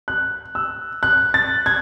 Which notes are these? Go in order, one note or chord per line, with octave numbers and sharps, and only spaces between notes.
F#6
E6
F#6
A6
G#6